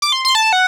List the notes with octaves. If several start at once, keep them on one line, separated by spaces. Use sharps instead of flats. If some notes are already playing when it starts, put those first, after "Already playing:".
D6
C6
C6
A5
F#5